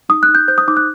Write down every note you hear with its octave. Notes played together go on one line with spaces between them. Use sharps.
D#4 D#6
F#6
D#4
G6
C5 G6
D#6
D#4 D6
F#6